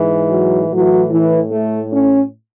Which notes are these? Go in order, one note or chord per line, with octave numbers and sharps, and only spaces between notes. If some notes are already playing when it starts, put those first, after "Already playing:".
Already playing: G#2 E3
F#3
A2 E3 F#3
E3
A3
C#4